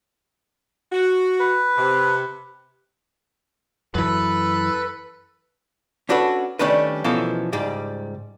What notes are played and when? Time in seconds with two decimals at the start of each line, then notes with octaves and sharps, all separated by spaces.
0.92 F#4
1.40 B4
1.77 C3
3.95 F#2 E3 A4 B4 B5
6.09 C#4 D4 F#4 A4 B4
6.59 D#3 G3 A3 C#4 D4 B4
7.04 B2 E3 F3 C#4 A4 A#4
7.53 C#2 G#2 G3 D5